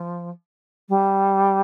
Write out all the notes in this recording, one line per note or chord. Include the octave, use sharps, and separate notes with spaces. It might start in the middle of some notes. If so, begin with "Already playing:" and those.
Already playing: F3
G3